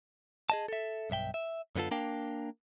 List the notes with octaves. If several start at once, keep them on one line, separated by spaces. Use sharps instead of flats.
G#4 D#5 A5
A4 E5
B1 G2 E5 G5
E5
F#2 D3 B3 F4 A4
A#3 D4 A#4 F5 G5 A5